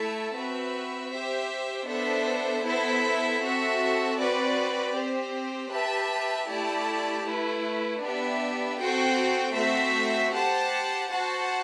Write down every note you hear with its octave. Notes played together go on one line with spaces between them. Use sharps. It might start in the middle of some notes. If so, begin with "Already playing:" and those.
Already playing: A3 E4 A4 E5 A5
C4 F#4 B4 E5
G4 C5 E5
B3 D4 A4 C5 E5
B3 E4 A4 C5 E5
C4 F#4 A4 E5
C4 F#4 B4 D5
C4 G4 C5
G4 B4 E5 A5
A3 E4 G4 D5 A5
A3 E4 B4
B3 D4 G4 B4 E5
C4 F#4 A4 C5 G5
A3 C4 F#4 C5 E5
G4 C5 F#5 A5
F#4 C5 F#5 A5